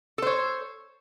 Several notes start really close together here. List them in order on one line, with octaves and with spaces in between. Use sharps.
A4 C5 C#5